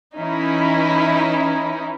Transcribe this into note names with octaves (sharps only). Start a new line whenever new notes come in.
E3 C#4 D#4 E4